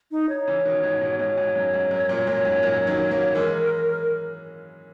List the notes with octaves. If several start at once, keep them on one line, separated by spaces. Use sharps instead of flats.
D#4
C#5
C#3 E3
B2 D#3
G#2 B2
G#2 B2
G#2 B2 C#5
G#2
F#2
G#2
F#2
F#2 A#2
F#2 A#2
G#2
F#2 A#2
D#3 F#3
F#3 A#3
E3 G#3 A#4